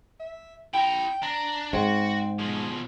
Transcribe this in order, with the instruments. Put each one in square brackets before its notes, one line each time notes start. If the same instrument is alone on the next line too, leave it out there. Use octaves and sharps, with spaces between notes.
[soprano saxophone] E5
[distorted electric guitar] E4 A#5 [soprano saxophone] G5
[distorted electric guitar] D4 [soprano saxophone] A#5
[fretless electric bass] G#2 [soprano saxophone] C4 [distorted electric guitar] F#4
[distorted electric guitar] B2 F3 [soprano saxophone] G#4